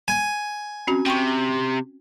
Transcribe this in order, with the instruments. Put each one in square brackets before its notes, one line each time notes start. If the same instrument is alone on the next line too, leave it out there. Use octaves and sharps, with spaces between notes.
[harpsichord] G#5
[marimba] C4 C#4 F#4
[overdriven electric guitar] C3 [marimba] G5 C6 C#6